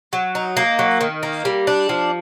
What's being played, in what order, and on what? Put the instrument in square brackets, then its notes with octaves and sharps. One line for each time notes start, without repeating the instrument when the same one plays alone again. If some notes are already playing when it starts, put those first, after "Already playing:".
[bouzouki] F#3
D#4
A#3
F#3
D#3
A#3
G3
D4
F3